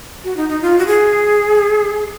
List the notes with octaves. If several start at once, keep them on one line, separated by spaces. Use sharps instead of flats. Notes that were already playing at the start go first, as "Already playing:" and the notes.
F#4
D#4
D#4
F4
F#4
G#4